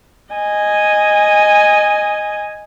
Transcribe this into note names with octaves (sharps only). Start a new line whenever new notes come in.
D#5 G#5